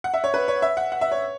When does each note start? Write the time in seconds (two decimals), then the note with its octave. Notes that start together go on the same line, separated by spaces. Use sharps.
0.04 F#5
0.14 E5
0.24 C#5
0.34 B4
0.48 C#5
0.62 E5
0.77 F#5
0.92 F#5
1.01 E5
1.12 C#5